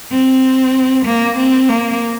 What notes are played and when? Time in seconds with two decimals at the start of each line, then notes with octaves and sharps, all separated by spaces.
0.12 C4
1.05 A#3
1.37 C4
1.69 A#3